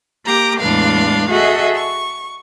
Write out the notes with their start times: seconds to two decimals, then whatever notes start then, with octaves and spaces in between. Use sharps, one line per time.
0.24 A#3 G4 A#5 D6
0.60 E2 A2 G#3 D4 B4 F5
1.29 F#4 G#4 A4 D#5 E5
1.75 C#6